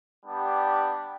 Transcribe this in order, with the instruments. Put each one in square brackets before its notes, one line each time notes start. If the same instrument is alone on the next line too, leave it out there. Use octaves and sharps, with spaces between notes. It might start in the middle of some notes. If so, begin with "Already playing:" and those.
[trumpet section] G3 B3 D4 G4